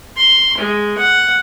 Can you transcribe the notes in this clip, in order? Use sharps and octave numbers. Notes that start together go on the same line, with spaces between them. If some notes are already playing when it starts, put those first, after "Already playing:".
C6
G#3
F#5